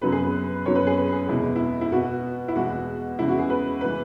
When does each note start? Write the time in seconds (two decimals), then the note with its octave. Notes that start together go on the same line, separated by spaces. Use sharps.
0.01 F#2 C#3 F#3 B3 B4
0.12 G#4
0.23 B4
0.66 F#2 F#3 B3 C#5
0.75 B4
0.87 G#4
0.97 B4
1.12 G#4
1.28 E2 B2 G#3 B3 E4
1.55 E4
1.81 E4
1.92 B2 B3 F#4
2.48 E4
2.55 E2 B2 G#3 B3 F#4
3.19 E2 C#3 G#3 B3 E4
3.28 F#4
3.39 G#4
3.50 B4
3.81 E3 G#3 B4